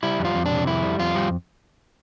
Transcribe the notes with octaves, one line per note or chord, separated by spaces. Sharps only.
G3 E4
F2
F4
F2
D4
C3
F2 E4
G3
F2 F4
G3